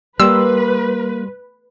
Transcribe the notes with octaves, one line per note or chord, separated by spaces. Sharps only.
G3 A#3 B4 C6 E6